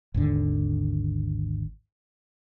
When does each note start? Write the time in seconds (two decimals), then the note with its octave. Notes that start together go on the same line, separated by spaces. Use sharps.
0.14 G#1 D#2 D3